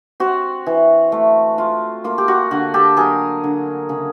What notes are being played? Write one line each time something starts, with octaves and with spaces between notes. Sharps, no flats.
C4 F#4
E3
A3
F4
A#3 F4
G4
F#4
D3 F#4
G4 A4
F#3 G#4 A#4
D3
C#3